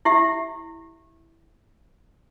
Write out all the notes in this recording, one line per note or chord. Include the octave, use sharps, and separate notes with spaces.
E4 G4 E5